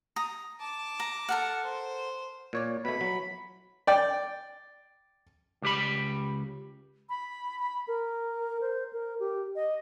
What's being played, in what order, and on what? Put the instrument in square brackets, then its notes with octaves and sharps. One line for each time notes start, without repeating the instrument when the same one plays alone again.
[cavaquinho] A#5 D#6
[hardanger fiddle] A5 D6
[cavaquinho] A#5
A4 A#4 F#5
[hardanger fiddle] C5
[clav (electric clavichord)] A#2 C#5 D5
[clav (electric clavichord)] B2 A3 [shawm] B5
[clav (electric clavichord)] F#3
[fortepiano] D5 G5
[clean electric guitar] C#2 G4 B5
[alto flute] B5
B5
A#4
C5
A#4
G4
D#5